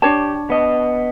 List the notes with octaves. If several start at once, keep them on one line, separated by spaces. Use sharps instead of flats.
D4 G4 C#5 A5
B3 D#5